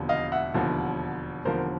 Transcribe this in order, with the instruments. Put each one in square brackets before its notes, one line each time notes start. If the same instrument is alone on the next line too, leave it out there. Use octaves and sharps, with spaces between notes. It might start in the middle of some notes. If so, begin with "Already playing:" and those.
Already playing: [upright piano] E1 D#2 D3 F3
D#5 F5
E5 F#5
E1 D#2 D3 F3
E1 D#2 D3 F3 A#4 C5